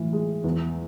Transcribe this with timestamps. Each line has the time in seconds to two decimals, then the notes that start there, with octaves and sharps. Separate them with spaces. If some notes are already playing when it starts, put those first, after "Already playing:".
Already playing: A2 E3
0.13 G#3
0.44 E2